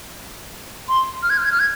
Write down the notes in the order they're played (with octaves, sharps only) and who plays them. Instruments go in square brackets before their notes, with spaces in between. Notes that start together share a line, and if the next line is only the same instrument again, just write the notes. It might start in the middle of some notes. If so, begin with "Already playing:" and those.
[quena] C6
F6
G#6
F6
G#6
F6
G#6